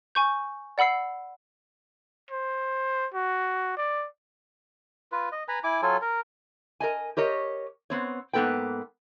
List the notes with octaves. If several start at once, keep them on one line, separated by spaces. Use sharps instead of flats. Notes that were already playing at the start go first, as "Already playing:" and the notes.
G#5 C#6 G6
D5 F#5 B5 E6 C7
C5
F#4
D5
F4 B4
D#5
B4 G#5 A#5 B5
E4 G#5 D6
F#3 F4 A4 G#5
A#4
A#4 D#5 G#5
G4 A#4 C#5 D#5
B3 C4 C#5
G#2 A#3 B3 A4 B4 G5